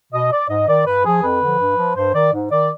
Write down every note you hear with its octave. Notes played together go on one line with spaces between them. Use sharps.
B2 D#5
D5
G#2 D#5
D#3 D5
G2 B4
F3 G#4
F2 B4
D3 F3
G2
F3
G2 C5
D#3 D5
G#2
D#3 D5